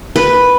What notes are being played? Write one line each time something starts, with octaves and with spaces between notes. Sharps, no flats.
B4